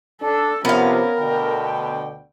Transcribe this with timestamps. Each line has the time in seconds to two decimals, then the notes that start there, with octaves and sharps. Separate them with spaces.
0.22 D4 A4
0.65 C3 F3 B3 C#4 A#4 F5
1.20 D2 B2 D3 G5